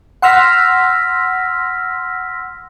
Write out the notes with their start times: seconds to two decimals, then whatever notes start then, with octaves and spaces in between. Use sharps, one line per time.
0.22 F#5 C6 E6 F6 A#6 B6